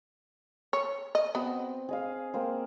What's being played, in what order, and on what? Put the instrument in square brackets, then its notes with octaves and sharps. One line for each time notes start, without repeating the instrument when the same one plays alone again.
[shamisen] C#5
D#5
[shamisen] B3 F#4 [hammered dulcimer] C4
[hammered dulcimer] G#4 D#5 F5
A#3 C4 C5